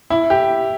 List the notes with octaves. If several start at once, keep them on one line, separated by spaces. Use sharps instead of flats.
E4
G4